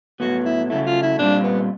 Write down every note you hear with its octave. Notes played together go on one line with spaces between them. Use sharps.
A2 F#3 B3 F#4
E4
C#3 F#3 A3 E4
F4
E4
A#2 G3 C4 D4 F4
B3